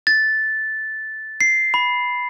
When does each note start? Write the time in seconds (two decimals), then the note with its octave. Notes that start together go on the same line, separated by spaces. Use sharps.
0.07 A6
1.41 C7
1.74 B5